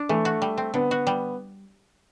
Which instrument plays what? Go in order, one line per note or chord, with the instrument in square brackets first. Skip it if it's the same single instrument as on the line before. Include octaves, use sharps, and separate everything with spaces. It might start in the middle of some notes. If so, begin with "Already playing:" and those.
Already playing: [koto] D4
[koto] E3 [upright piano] A3
[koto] F#4
G3
C4
[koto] D3 [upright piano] B3
[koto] F#4
G3